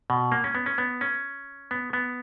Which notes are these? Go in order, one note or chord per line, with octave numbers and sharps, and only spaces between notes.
B2
A#3
C#4
B3
C#4
B3
C#4
B3
B3